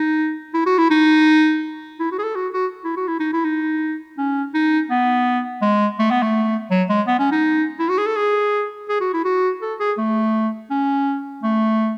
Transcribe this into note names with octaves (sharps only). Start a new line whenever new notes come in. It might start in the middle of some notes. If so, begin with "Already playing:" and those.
Already playing: D#4
E4
F#4
E4
D#4
E4
F#4
G#4
A4
F#4
F#4
E4
F#4
E4
D#4
E4
D#4
C#4
D#4
B3
G#3
A3
B3
A3
F#3
G#3
B3
C#4
D#4
E4
F#4
G#4
A4
G#4
G#4
F#4
E4
F#4
A4
G#4
A3
C#4
A3